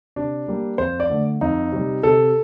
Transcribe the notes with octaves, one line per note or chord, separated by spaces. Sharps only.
C3 D4
G3 A#3
F2 C5
D5
D3 A3
F2 D#4
C3 G3
C3 A4